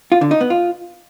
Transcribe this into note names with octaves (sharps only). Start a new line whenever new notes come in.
F4
D3
D#4
B3
F4